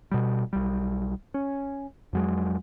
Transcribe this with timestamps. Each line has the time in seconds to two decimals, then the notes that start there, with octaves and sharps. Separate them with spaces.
0.11 B2 G3
0.53 B1 G3
1.34 C#4
2.13 F2 F#3 G#3